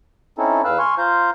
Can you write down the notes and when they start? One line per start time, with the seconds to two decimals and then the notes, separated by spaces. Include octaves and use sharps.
0.38 C4 C#4 D#4 E4 A4
0.65 E2 B4 F5 E6 F#6
0.79 G#5 C6 C#6 F6
0.98 F4 C5 F5 A#5 G6